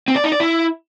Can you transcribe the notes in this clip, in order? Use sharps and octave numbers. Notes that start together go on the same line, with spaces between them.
C4
D5
D#4
D5
E4